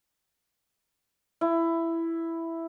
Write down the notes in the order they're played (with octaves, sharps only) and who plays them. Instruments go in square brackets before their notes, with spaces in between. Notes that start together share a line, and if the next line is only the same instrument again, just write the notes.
[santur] E4